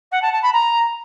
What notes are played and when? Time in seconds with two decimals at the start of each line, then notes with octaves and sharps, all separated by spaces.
0.11 F#5
0.22 A5
0.32 A5
0.42 B5
0.53 A#5